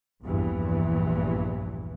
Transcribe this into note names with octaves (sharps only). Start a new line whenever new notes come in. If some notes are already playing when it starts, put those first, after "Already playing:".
A#1 E2 G2 E3